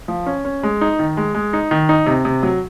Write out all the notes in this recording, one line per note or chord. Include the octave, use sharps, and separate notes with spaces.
F3
C#4
C#4
G#3
D#4
D#3
G#3
G#3
D#4
D#3
D#4
C3
C3
F#3